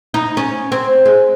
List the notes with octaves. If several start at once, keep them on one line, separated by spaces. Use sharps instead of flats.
D#4
C#4
C4
G#3